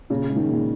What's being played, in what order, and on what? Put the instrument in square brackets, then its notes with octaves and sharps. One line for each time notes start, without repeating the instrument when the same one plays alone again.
[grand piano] A#2 [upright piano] C#3
[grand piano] G#3
[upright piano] D#3
[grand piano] A#2